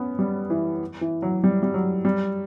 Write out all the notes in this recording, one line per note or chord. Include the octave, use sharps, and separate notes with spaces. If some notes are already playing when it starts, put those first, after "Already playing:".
Already playing: B3 C#4
G3
E3
E3
F#3
G3
G3
F#3
G3